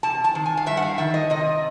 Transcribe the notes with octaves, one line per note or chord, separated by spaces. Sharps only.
C3 A5
A5
D#3
G#5
F5
G2 E5
F#5
F5
D#3 E5
D#5
C3 D#5